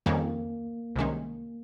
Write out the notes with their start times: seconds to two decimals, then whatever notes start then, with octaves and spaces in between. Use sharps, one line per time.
0.06 F2 D#3 G3 A#3 C#4
0.96 C2 C3 D#3 G#3 C#4